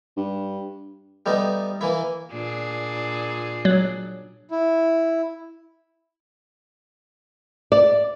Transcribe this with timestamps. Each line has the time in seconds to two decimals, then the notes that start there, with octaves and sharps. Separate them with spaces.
0.17 G2
1.26 G3 A3 B3 D#4
1.81 E3 A#3 E4
2.32 A#2 D4 G#4
3.65 F#3
4.51 E4
7.72 D5